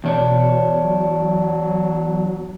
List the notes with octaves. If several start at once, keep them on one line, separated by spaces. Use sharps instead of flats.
E2 B2 D4 C#5
F#3